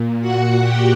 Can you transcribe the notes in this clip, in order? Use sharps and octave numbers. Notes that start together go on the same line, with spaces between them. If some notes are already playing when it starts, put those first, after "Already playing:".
Already playing: A#2
F#4 F#5
G4 G5